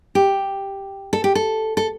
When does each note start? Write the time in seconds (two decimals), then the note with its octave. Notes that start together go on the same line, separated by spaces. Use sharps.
0.15 G4
1.13 A4
1.24 G4
1.35 A4
1.77 A4